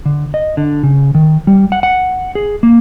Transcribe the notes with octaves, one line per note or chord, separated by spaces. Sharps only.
D3
D#5
D3
C#3
D#3
G3
F#5
F#5
G#4
A#3